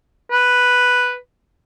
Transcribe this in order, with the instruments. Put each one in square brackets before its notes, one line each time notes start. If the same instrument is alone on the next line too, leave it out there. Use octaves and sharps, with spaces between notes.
[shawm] B4